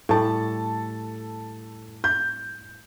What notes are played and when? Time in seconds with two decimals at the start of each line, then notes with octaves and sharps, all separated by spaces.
0.09 A2 G3 A4 A5
2.04 G6